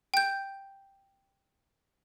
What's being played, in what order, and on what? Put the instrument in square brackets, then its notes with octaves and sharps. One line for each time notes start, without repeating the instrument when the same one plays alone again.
[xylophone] G5 G6